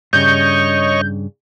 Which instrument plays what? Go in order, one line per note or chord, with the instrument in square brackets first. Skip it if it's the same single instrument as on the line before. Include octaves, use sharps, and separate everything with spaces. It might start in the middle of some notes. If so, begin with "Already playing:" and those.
[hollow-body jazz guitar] G2 C#3 [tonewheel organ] C#5 D#5 C#6 [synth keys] G6